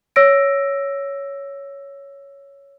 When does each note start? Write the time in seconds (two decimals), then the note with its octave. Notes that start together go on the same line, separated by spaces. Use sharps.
0.16 C#5 E6 A#6 D7